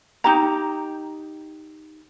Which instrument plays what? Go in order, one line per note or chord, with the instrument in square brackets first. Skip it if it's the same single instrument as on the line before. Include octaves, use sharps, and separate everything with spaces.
[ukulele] D#4 G4 A#5